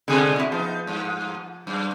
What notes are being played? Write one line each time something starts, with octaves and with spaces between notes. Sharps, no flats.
G#2 B2 D3 G#3 G#4 A4
E4 F#4
F3 B3 D#4
G2
F#2